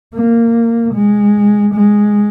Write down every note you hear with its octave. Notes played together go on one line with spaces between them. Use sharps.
A#3
G#3
G#3